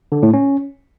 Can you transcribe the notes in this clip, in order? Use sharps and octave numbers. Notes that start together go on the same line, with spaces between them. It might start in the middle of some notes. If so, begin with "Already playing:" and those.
D3
A2
C#4